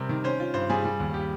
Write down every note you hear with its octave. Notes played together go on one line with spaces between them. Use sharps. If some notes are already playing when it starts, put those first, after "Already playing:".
Already playing: C3 G3 C4 A#4
D#3
C#4 C5
F4
G2 C5
G3 G#4
G3
D#2
G4